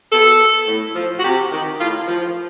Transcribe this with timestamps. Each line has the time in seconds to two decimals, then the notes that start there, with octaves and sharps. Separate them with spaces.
0.12 B2 A4
0.67 A2
0.95 F3
1.19 F#4
1.24 C3 G4
1.52 D#3
1.79 A2 F4
2.08 F3